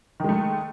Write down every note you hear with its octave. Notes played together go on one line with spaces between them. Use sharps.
D#3 G#3 A3